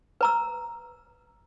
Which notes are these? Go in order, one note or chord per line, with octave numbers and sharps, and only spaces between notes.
B4 A#5 E6